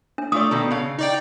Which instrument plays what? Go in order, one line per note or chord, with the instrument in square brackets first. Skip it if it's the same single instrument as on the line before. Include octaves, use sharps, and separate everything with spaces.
[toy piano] D4
[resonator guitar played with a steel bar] A3 F4 D5 [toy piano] D#6
[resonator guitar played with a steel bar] B2 D#3 A4
C#3 F5
[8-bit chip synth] D#4 D5 G5